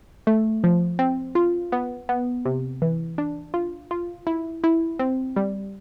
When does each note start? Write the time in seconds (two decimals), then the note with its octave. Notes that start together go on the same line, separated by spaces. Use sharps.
0.27 A3
0.64 F3
0.99 C4
1.35 F4
1.72 B3
2.09 B3
2.45 C3
2.82 E3
3.18 D4
3.54 F4
3.91 F4
4.27 E4
4.64 E4
4.99 C4
5.36 G3